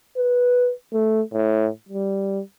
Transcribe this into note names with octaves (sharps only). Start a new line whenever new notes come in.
B4
A3
A2
G3